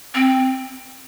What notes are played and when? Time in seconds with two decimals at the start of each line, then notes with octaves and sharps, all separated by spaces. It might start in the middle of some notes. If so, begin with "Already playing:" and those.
0.15 C4